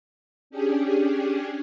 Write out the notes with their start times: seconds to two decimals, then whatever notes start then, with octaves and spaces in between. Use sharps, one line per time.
0.50 C#4 D4 G4 G#4